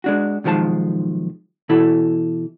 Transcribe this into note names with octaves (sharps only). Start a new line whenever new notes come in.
G#3 D4 F#4
B1 D#3 F3 G#3 A5
B2 E3 E4 A4